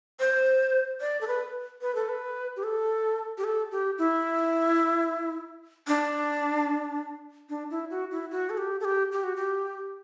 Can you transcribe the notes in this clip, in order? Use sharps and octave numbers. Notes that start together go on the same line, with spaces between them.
C5
D5
A4
B4
B4
A4
B4
G4
A4
G4
A4
G4
E4
D4
D4
E4
F#4
E4
F#4
A4
G4
A4
G4
G4
F#4
G4